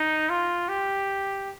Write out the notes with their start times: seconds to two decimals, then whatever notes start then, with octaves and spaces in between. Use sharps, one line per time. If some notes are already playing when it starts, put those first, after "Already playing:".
Already playing: D#4
0.29 F4
0.68 G4